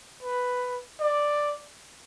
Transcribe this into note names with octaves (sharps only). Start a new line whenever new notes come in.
B4
D5